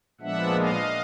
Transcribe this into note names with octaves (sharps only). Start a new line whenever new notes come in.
A#2 F3 G#3 B3 D4 E5 F#5
D#5 F5